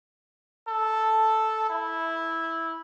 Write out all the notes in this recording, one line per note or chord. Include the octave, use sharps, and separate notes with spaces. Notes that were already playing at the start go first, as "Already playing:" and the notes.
A4
E4